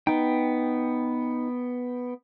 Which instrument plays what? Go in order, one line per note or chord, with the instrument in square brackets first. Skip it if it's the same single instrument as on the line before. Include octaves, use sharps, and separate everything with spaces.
[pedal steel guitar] B3 G5 [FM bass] D#4